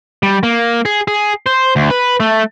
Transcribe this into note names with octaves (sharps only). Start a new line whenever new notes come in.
G3
A#3
G#4
G#4
C5
D2
B4
A3